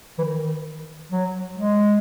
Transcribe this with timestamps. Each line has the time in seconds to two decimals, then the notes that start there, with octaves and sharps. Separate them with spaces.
0.18 E3
0.23 D#3
1.11 F#3
1.56 G#3